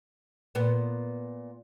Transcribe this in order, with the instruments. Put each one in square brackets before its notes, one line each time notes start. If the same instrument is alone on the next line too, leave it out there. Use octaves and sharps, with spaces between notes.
[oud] A#2 B3